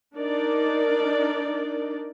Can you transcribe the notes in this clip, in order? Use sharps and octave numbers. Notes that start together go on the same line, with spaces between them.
D4 D#4 A#4 D5